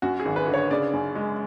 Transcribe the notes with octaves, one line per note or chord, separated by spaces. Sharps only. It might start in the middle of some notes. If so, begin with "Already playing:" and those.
F#2 F#4
G#4
G#1
B4
D3
C#5
C#3 D5
F#2
G#3